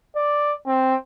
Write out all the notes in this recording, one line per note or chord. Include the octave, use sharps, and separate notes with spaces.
D5
C4